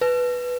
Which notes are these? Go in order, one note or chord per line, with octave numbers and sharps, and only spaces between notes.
B4